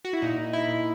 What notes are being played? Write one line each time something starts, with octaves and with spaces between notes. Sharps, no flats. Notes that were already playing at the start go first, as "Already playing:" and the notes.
F#4
E4
A#2 D#4
E4
A#2